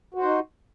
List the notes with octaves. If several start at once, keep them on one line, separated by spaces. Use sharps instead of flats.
D#4 F#4 C5